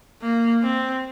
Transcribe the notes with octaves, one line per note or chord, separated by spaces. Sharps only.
A#3
C4